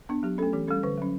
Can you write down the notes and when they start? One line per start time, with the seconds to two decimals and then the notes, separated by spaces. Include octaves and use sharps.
0.09 B3 D4
0.23 F#3 G4
0.38 A3 C#4 A4
0.53 E3 G4
0.68 G3 C#4 A4
0.83 D3 B4
0.98 F#3 C#4